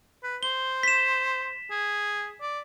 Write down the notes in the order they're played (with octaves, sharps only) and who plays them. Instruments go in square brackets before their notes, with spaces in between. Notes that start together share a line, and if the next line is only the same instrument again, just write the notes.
[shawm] B4
[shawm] C5 [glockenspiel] G7
[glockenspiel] B6 E7
[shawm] G#4
D5